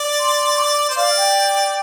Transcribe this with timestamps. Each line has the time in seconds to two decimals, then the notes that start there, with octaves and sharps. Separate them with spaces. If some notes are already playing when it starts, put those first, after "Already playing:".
Already playing: D5
0.19 C6
0.54 C6
0.58 D6
0.89 C5
0.97 D5 F5
1.17 G5